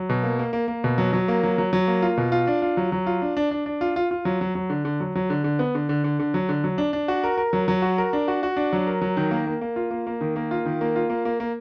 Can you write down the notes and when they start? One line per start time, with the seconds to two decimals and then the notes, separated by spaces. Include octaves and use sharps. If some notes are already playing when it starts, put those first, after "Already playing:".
Already playing: F#3
0.09 B2
0.23 A#3
0.39 A#3
0.53 A#3
0.68 A#3
0.84 B2
0.98 F#3
1.13 F#3
1.28 A#3
1.43 F#3
1.58 F#3
1.73 F#3
1.88 A#3
2.02 F4
2.17 B2
2.32 F4
2.47 D4
2.62 F4
2.77 F#3
2.92 F#3
3.07 F4
3.22 D4
3.37 D4
3.51 D4
3.66 D4
3.81 F4
3.96 F4
4.11 F4
4.25 F#3
4.41 F#3
4.55 F#3
4.70 D3
4.85 D3
5.00 F#3
5.15 F#3
5.30 D3
5.44 D3
5.59 B3
5.75 D3
5.89 D3
6.04 D3
6.19 D3
6.34 F#3
6.49 D3
6.64 F#3
6.78 D4
6.93 D4
7.08 F#4
7.24 A#4
7.38 A#4
7.53 F#3
7.68 F#3
7.82 F#4
7.98 A#4
8.13 D4
8.28 F#4
8.43 F#4
8.57 D4
8.73 F#3
8.87 A#4
9.01 F#3
9.17 D#3
9.31 A#3
9.47 A#3
9.61 A#3
9.76 F4
9.91 A#3
10.07 A#3
10.21 D#3
10.36 A#3
10.51 F4
10.66 D#3
10.81 A#3
10.96 F4
11.10 A#3
11.25 A#3
11.40 A#3